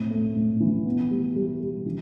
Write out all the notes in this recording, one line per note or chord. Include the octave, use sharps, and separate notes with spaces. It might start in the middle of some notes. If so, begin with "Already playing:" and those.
Already playing: A2 C4
A3
A2
E3
B3
G3
G3
G3
E3